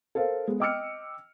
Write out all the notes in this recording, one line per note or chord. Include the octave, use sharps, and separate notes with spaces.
A4 A#4 C5 F5
G#3 B3
D#5 G5 D6 E6 F6 C#7